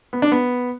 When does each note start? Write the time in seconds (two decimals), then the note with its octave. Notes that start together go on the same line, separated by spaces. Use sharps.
0.13 B3
0.22 D4
0.32 B3